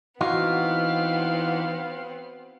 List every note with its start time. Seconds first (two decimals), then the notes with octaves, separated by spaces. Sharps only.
0.21 E3 B3 C4 D#4 F4 F#4 F5